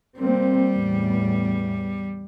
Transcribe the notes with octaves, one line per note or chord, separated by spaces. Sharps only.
G3 A#3 C4
E2 A2